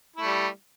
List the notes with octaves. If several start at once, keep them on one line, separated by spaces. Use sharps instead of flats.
G3 A3 E4